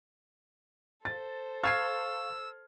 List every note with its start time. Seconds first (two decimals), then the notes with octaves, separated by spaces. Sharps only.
1.05 A4 C5 A6
1.63 F5 C#6 E6 F6 G#6 A6 C7